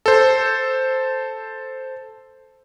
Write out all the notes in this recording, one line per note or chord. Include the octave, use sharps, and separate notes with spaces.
A4 C5